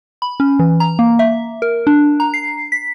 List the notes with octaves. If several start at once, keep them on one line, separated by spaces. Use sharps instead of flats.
B5
C#4
E3
A#5
A#3
E5
A#4
D4
A#5
C7
B6